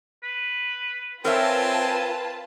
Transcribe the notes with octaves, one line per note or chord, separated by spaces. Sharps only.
B4
C4 F4 A#4 B4 C#5 E5 G#5 A5